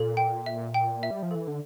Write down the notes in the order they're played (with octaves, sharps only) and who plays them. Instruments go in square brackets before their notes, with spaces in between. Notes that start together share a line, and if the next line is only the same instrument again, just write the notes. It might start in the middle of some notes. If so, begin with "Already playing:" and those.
Already playing: [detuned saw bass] A#2 [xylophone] A4
[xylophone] G5
E5
G5
E5
[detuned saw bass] G3
F3
[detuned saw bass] E3 [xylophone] A4
[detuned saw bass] D3